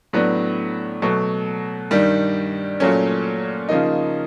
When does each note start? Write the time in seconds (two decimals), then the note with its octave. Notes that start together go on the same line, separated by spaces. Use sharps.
0.13 A2 F#3 B3 D4
1.02 B2 F#3 A3
1.91 G2 D#3 G3
2.80 A#2 F#3 A3 C#4
3.69 C#3 F3 A#3 D#4